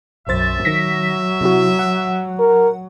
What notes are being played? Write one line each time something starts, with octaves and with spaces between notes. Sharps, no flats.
B1 F#2 C5 E5 A6
D#3 F#3 A#6 B6
C3 E4 F#4
F#5
A#4